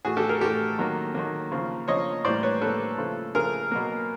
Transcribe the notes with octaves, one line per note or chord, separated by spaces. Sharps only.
A2 E3 A3 F#4 G#4
G4 A4
G#4 A#4
A2 E3 A3 G4 A4
D#3 F#3 A#3
D#3 F#3 A#3
C#3 F3 A#3
C#3 F3 A#3 C#5 D#5
A2 E3 G3 A#3 C5 D5
B4 C#5
A2 E3 G3 A#3 A4 B4
C#3 F3 A3
C#3 F3 A3 G#4 A#4
B2 F#3 A#3